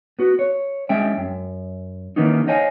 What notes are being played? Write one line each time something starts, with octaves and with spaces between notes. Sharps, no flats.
B3 F#4
C#5
G#3 C#4 E5 G5
F#2
D#3 E3 A#3 B3 C#4 D#4
C5 C#5 D#5 F5 G#5